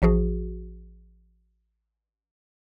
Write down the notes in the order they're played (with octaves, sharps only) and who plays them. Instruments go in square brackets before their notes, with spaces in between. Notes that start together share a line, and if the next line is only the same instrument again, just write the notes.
[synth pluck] A1 F3 F#4 G#4